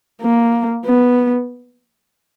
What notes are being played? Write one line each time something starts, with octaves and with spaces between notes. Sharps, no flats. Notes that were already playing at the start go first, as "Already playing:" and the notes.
A#3
B3